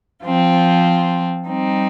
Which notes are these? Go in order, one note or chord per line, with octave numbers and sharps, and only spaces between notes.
F3 C4 F4
G3 C4 D#4